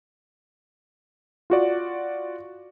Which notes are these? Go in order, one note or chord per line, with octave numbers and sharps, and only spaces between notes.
F4 F#4 D5